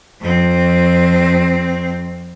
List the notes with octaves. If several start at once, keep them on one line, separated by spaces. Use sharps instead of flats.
F2 C4